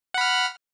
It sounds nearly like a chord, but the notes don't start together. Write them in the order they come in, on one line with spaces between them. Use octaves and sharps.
F#5 B5 F6